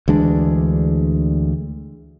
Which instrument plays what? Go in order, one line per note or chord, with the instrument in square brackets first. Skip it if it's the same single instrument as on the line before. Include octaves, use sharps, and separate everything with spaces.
[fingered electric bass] D2 E3 G#3 D4